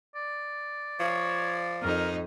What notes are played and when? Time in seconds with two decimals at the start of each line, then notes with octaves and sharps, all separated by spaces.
0.15 D5
1.00 F3 C#5
1.82 F2 D#4 A#4